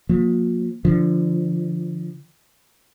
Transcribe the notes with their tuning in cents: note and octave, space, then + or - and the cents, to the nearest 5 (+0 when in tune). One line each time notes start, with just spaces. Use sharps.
F3 +45 A#3 +0
D3 +0 F3 -20